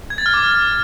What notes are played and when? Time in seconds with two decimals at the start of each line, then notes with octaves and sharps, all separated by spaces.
0.10 G#6
0.18 A6
0.26 F6
0.34 D6